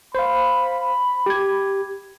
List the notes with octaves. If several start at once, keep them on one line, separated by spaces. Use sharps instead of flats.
C5 F5 B5
G4 G#6